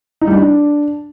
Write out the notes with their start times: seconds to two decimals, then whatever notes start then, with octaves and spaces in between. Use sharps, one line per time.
0.21 D#4
0.27 G3
0.33 D4